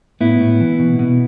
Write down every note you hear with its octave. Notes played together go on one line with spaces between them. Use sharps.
A2 B3 E4
A2
E3
B2
B2